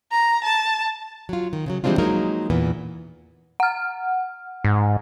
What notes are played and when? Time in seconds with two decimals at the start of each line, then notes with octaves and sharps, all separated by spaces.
0.11 A#5
0.44 A5
1.29 F#3 F4
1.53 D#3
1.66 C#3 F3 F#3
1.84 E3 G3 G#3 C4 D4 F4
1.98 F3 F#3 G#3 A#3 D#4 A#4
2.50 E2 A#2 E3 B3
3.60 F#5 F6
4.64 G#2